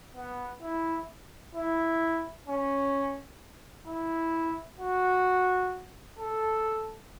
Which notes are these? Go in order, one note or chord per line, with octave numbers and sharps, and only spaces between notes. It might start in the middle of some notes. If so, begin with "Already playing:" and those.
B3
E4
E4
C#4
E4
F#4
A4